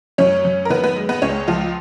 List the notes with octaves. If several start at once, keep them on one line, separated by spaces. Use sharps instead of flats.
F#2 C#4 C#5
F#2
A#4
D#3 B3 B4
B3 B4
G#3
B3 B4
C#2 C#4 C#5
C#2 F3 F4